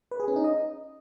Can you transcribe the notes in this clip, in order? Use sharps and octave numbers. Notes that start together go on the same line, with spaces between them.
B4
G#4
C#4
D#4
D#5